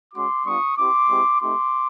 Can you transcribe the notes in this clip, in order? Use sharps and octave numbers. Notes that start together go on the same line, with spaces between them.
G#3 C#4 F#4 C6 D6
G3 B3 D4 F4 C#6 D#6
C4 E4 G4 C6 D6
G#3 C4 E4 G4
A3 C4 D#4 G4 C6 D6